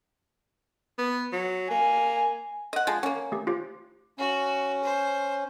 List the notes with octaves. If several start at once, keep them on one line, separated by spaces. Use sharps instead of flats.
B3
F#3
A#3 G#5
D#5 F#5
F3 G#3
A#3 C#4 F#5
A3 G4
F4 G4 C5
C#4 F#4
C5